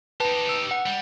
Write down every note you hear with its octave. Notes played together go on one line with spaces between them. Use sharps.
D#4 G4 B4 A5
E6
F#5
G3